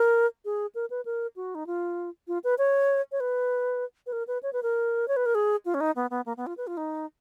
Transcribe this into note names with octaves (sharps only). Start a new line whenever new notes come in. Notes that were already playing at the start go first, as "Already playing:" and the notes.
Already playing: A#4
G#4
A#4
B4
A#4
F#4
D#4
F4
F4
B4
C#5
C#5
B4
B4
A#4
B4
C#5
B4
A#4
C#5
B4
A#4
G#4
F4
C#4
D#4
B3
B3
A#3
B3
F4
B4
F4
D#4